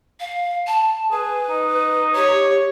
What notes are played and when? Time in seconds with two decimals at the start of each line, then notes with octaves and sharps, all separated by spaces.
0.20 F5
0.67 A5
1.11 G#4 B4
1.50 D#4
2.15 G4 C#5